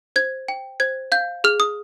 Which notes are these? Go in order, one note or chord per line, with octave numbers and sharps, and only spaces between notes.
C5 G#6
G5
C5 G#6
F5 G6
G#4 F6
D#6